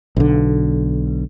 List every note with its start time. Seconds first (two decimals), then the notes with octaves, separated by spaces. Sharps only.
0.17 B1 D3